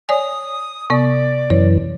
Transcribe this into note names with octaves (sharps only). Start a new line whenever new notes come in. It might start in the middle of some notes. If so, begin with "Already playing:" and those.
C#5 D5 G#5 D#6
C3 B3 D5
F#2 E3 C#5